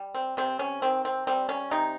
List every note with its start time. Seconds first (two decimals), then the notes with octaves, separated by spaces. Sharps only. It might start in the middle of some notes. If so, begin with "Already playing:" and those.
Already playing: G3
0.15 C4
0.37 C3 C4
0.59 C#4
0.82 D#3 C4
1.05 C4
1.27 G3 C4
1.49 C#4
1.71 C3 D#4